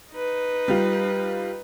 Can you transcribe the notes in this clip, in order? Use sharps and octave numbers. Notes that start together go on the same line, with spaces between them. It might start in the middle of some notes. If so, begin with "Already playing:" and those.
D#4 B4
G3 F4